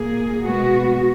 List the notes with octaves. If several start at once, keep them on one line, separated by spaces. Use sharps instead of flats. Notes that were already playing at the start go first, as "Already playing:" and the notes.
Already playing: A#2 A#3 G#4
B2 G#3 B3 F#4